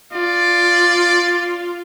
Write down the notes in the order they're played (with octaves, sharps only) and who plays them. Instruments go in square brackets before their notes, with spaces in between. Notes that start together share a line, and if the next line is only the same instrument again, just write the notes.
[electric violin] F4 [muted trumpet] D5